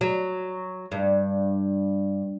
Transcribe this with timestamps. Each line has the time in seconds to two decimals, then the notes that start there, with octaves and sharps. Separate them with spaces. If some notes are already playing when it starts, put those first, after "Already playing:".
0.01 F#3
0.92 G2